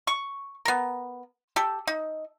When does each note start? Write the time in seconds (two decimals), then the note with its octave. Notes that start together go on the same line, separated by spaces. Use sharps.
0.07 C#6
0.65 B3 A#4
1.56 G4 A4
1.87 D#4